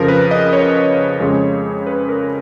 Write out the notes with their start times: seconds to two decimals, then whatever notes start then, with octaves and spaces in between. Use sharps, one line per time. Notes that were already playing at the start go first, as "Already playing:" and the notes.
Already playing: F2 C#3 F3 A#4
0.08 B4
0.31 D#5
0.53 C#5
1.20 F2 C#3 G#3
1.87 B4
2.09 A#4